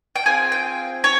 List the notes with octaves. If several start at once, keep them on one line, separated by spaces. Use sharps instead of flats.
G5
C4 F4 G#4 G#5
G5
C#5